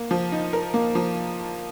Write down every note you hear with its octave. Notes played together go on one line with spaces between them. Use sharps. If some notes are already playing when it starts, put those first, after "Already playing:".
Already playing: A#3
F3
D#4
A#4
A#3
F3